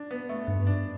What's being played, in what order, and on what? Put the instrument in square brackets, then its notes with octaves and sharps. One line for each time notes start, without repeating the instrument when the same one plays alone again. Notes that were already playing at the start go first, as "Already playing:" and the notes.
Already playing: [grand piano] D4
B3
A3
[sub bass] G2 [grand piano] B3
[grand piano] D4